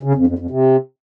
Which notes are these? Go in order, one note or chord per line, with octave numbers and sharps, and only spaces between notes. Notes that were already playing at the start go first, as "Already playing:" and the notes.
C#3
F2
F2
F2
C3